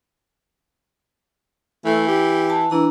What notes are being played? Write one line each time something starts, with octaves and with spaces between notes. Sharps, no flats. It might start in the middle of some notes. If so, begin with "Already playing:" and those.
E3 A3
G4
A5
E3 D4 A#5